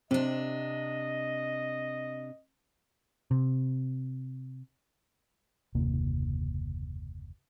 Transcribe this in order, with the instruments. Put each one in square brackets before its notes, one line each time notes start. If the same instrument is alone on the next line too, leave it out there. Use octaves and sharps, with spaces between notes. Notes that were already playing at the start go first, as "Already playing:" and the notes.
[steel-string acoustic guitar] C3 D4 [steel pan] C4 [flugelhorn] D#5
[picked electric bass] C3
[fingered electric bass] F#1 D#2 C3 A#3